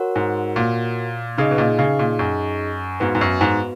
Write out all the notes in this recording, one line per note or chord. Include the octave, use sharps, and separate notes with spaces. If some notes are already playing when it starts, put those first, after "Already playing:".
Already playing: F#4 A#4 C#5 F#5
G#2
A#2
C#3 D#4 G#4 D#5
B2
A#2
C#3
A#2
F#2
G#2 B3 F#4 B4
G#2
F#2
G#2